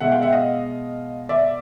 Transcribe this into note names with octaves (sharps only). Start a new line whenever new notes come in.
B2 G#3 E5 F#5
F5 G5
E5 F#5
D#5 F5
D5 E5